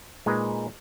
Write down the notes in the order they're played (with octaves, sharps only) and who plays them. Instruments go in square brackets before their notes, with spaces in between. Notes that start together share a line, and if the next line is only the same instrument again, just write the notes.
[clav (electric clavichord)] A#2 G#3 D#4 G#4 B4